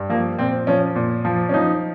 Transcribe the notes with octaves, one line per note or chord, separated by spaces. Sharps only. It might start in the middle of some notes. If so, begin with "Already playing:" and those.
Already playing: G2
F3 A#3
A#2 C4
F3 C#4
A#2
F3
C#4
F3 D#4